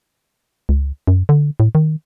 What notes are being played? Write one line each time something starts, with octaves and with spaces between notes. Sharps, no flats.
C#2
F#2
D3
A2
D#3